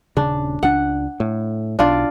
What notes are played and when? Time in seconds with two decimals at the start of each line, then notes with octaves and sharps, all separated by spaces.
0.17 D#1 C#3 D4
0.63 C#2 D4 F#5
1.20 A2
1.79 B1 D4 F4 D5